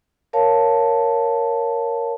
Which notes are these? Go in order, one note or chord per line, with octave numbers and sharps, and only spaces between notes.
A#4 C#5 F5 A5